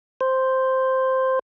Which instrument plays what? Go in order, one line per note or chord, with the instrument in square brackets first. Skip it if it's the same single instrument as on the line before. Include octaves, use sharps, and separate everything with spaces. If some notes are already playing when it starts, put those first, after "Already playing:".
[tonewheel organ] C5